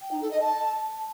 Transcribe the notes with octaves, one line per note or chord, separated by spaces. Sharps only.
G5
D#4
A4
D#5
A5